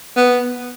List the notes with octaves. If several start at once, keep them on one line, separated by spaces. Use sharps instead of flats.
B3